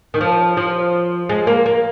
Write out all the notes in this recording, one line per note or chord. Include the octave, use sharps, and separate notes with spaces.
D#3
F3
F3
G#3
A#3
A#3